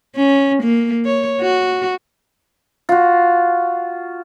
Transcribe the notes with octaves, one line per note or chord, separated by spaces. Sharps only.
C#4
A#3
C#5
F#4
F4 F#4